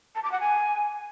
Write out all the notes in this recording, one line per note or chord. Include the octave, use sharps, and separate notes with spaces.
A5
D6
F#5
G#5